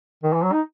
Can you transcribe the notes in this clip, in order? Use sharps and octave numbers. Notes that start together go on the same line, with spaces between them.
D#3
E3
F#3
D#4